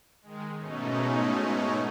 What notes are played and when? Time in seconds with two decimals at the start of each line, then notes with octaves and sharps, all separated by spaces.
0.22 D#3 G#3
0.57 G#2 B2 A3 C#4 D#4